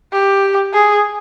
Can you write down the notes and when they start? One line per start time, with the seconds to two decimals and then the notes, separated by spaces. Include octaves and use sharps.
0.12 G4
0.73 G#4